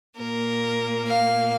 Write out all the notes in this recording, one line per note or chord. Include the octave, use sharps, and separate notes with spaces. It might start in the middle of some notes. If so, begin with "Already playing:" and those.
A#2 A#3 A#4
F5